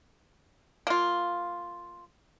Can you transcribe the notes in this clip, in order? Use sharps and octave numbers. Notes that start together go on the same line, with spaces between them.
A#3 F4